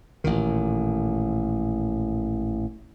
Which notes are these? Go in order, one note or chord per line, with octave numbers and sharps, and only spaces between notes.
A1 A#2 D#3